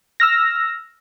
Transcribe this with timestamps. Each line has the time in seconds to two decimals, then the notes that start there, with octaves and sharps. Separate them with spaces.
0.20 E6 F6 A#6